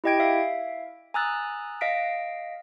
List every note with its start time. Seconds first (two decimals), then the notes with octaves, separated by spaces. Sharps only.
0.04 E4 G4 D#5 G5 G#6 D7
0.20 E5 F5
1.14 G#5 A#5 D#6 E6 F#6 A6
1.81 D#5 F5 A#6 B6 D7